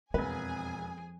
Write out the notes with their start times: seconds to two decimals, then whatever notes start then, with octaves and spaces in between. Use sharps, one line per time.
0.14 E1 F2 C4 G#4 B4 G#5